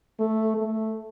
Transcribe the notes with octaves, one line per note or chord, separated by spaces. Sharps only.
A3
A3